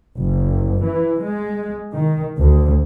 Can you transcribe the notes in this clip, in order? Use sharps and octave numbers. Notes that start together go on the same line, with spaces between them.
F#1
E3
G#3
D#3
D2